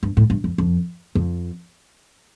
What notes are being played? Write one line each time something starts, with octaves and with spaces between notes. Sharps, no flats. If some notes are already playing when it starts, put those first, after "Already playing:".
G2
A2
G2
F2
F2
F2